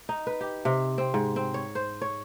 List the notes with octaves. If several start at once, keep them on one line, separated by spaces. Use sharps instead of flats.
D#4
B4
G4
C3
C4
G#2
C4
C#5
C5
C#5